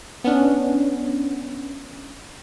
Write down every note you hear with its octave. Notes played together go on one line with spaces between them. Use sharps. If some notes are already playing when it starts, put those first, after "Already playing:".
B3 C#4 D4